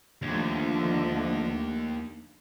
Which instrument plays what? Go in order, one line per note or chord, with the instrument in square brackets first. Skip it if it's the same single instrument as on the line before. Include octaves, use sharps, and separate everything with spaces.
[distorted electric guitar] D#2 [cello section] D3 F3 A3